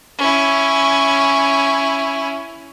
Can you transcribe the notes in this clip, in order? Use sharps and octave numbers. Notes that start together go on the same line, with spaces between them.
C#4 E4